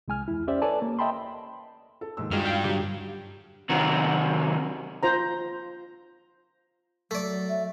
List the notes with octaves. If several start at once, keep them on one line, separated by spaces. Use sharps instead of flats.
C2 G#3 G#5 F6
E2 E4
C#4 G4 C5 D5 E5
A4 B4 C#5 D5 G#5 A5
A#3
D#5 E5 G5 A5 B5 C6
A4
D#2 G#2 E6
G2 G3 G#3 D#4 F4 F#4 F6
F5 G5
D3 F#3 G4
C3 D#3 F#3 F#4
F4 C5 A#5
F#3 A3 D5
E5